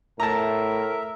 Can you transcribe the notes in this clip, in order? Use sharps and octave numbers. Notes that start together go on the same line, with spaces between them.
A2 A#4 E5 A5 A#5